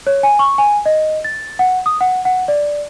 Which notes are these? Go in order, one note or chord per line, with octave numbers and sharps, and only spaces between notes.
C#5
G#5
C#6
G#5
D#5
A6
F#5
D#6
F#5
F#5
D5